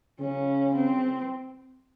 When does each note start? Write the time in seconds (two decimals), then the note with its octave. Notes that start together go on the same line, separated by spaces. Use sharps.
0.20 C#3 C#4
0.75 C4